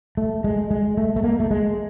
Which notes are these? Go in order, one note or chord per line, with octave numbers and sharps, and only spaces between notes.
A3
G#3
G#3
A3
A3
A#3
A3
G#3